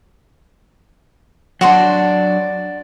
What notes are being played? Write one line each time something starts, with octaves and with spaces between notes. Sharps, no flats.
F#3 D4 F#4 D5 C6